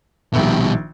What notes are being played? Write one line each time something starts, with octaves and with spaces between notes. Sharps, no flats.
A#1 B2 D#3 G3 E5